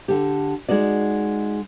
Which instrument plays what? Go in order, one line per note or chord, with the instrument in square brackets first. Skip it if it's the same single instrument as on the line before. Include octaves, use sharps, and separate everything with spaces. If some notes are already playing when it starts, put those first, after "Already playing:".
[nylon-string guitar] D3 G4
G#3 D#4 F#4 D5